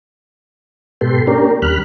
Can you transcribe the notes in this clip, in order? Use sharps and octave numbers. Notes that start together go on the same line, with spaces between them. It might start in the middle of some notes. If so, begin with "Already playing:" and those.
G#2 B2 G4 A4 B4 C6
A#3 C#4 D4 G4 A#4
D#2 G3 B5 F6 F#6